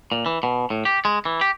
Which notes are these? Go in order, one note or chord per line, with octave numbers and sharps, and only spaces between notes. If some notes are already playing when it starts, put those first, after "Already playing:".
A#2
E3
B2
A2
G4
G#3
E3
G4